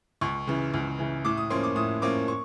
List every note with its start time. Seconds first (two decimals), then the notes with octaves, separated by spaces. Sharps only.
0.21 C#2 C#6
0.47 C#3 E3
0.74 C#2
0.99 C#3 E3
1.25 A2 D6
1.37 D#6
1.50 F3 A#3 C#4 C6
1.63 D6
1.76 A2 D#6
2.02 F3 A#3 C#4 D6
2.28 C#6